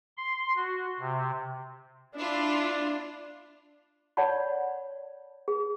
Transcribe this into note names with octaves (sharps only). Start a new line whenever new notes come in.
C6
F#4
C3
D4 E4 F4
C#5 D5 F#5 A5 B5
G#4